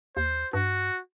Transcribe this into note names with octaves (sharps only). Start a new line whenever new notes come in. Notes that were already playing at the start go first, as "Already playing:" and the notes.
D#2 C5
G2 F#4